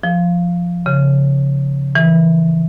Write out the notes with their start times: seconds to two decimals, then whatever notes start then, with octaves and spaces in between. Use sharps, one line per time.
0.03 F3
0.86 C#3
1.95 E3